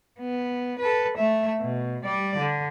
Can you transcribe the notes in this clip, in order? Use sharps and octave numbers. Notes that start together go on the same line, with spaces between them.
B3
A4 B4
A3 E5
B2
G3 D5
D3